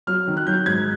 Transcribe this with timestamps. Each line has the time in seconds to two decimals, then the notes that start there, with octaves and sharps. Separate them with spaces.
0.07 F#3 F6
0.27 D#3
0.37 F#6
0.47 F#3 G6
0.66 G#2 G#6